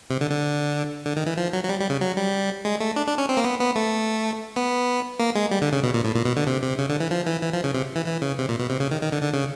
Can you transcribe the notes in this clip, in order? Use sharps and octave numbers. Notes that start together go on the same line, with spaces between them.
C3
D3
D3
D3
D#3
E3
F3
F#3
F#3
G3
G3
C#3
F#3
G3
G#3
A3
D4
D4
C#4
C4
A#3
B3
B3
A3
B3
A#3
G#3
G3
D3
C#3
B2
A#2
A2
A#2
B2
D3
C3
C3
C#3
D3
E3
F3
E3
E3
F3
C#3
C3
E3
E3
C#3
C3
A#2
B2
C3
C#3
D#3
D#3
D3
D3
C#3